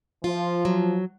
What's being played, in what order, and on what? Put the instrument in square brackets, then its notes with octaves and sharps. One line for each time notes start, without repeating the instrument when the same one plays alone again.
[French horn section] F3 [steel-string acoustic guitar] F4
[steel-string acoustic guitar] F#3